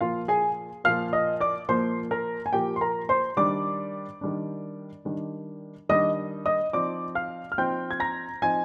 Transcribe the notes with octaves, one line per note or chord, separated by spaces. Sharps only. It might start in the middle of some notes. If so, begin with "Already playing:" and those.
A#2 F3 A#3 F4 F5
G#4 G#5
A#2 F3 A#3 F5 F6
D#5 D#6
D5 D6
A#2 F3 A#3 C5 C6
A#4 A#5
G#5
A#2 F3 A#3 G4 G5
C6
A#4 A#5
C5 C6
D#3 G3 D4 D5 D6
D#3 G3 D4
D#3 G3 D4
D#3 G3 D4 D#5 D#6
D#5 D#6
F3 C4 D#4 D5 D6
F5 F6
F6
F3 C4 D#4 G5 G6
G#6
A#5 A#6
F3 C4 D#4 G#5 G#6